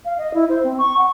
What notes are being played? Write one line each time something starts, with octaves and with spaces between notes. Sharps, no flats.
F5
D#5
E4
C5
C4
C#6
F#5